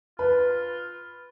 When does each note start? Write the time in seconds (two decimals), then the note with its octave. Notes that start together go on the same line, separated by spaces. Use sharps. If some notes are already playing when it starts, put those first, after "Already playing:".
0.19 F4 B4